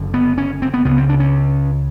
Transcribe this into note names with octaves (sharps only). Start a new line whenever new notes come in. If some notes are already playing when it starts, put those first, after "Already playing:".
Already playing: F#1 F#2 D3
B3
C#4
C4
B3
C#2 C#3 B3
C4
D4
C#4